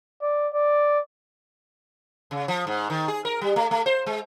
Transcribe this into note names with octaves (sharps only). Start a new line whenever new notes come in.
D5
D5
C#3
F3
G#2
D#3
G#4
A#4
G3
A3
A3
C5
G#3